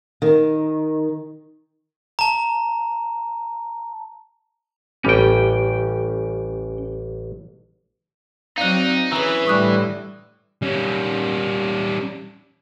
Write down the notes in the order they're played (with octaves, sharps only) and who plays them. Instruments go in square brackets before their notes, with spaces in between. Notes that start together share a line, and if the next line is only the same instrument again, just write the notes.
[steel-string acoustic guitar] D#3
[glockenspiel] A5 A#5
[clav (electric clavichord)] A1 G3 [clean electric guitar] C#4 G5
[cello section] F#3 C4 D5 [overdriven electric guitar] D#4 [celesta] F5 F#6
[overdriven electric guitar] E3 [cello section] C#4 G#4 B4 [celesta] E6 F#7
[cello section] A2 D3 [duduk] G3 [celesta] C#6 D#6 F#6
[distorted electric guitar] G3 C#4